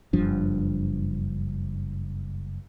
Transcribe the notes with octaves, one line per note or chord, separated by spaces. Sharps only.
F#1 G2 F3 D4